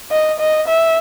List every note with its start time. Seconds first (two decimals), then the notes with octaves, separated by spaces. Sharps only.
0.11 D#5
0.40 D#5
0.68 E5